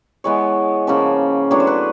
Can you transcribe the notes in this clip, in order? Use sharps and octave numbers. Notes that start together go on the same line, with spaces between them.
E3 G#3 B3 C#5
C#3 F3 A#3 C#4
A2 F#3 B3 D4 C#5
C5
B4